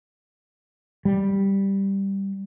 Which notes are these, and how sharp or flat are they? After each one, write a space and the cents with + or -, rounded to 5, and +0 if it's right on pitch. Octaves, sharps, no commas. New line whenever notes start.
G3 +0